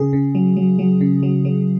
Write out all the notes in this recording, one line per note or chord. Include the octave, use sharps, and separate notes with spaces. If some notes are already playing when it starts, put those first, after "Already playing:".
Already playing: C#3 G#4
C#3
F#3
F#3
F#3
C#3
F#3
F#3